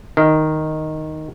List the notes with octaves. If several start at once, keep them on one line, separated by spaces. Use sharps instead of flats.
D#3